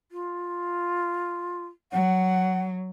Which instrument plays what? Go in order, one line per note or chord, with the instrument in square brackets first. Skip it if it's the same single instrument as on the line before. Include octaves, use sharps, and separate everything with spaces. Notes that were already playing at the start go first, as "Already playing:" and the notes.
[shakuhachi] F4
[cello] F#3 [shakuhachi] F#5